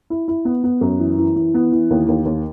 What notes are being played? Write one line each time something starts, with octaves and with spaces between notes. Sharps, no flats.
E4
E4
B3
B3
F#2
E3
E3
E3
B3
E3
D#2
D#2
D#2